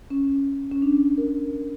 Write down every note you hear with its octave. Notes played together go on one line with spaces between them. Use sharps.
C#4
C#4
D4
A#4